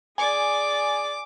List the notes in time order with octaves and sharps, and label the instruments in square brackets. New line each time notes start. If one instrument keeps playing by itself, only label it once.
[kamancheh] G#4 D5 [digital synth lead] G#5 [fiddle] D6